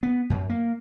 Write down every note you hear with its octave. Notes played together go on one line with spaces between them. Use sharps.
B3
F#2
A#3